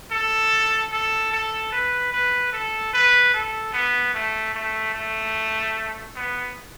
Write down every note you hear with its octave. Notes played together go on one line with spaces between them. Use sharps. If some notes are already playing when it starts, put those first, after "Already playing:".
A4
A4
A4
B4
B4
A4
B4
A4
B3
A3
A3
A3
B3